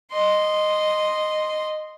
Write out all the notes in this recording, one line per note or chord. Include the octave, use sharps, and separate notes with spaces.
D#5 C6